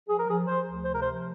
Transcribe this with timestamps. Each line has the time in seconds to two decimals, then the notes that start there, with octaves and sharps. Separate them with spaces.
0.09 F3 G#4
0.19 A#4
0.28 F3 G#4
0.47 F3 C5
0.66 D2
0.85 C3 C5
0.94 A#4
1.01 C5
1.05 F3